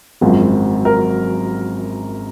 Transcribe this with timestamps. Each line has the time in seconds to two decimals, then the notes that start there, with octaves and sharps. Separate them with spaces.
0.21 G#1 F#2 F3 G#3 F#4
0.85 A#4